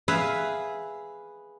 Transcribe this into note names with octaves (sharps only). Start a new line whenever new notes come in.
G#4 B4 E5 F5